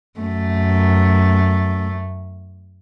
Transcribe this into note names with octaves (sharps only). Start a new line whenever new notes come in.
F#2 A3